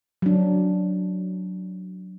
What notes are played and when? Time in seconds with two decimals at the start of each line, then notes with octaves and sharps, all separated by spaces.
0.22 F#3 D4